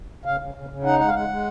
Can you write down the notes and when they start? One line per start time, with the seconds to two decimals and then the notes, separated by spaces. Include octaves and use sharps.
0.25 C#3 F5
0.40 C#3
0.54 C#3
0.69 C#3
0.84 D#4 F#5
0.99 G#3 F#5
1.08 F5
1.14 G#3 F#5
1.28 G#3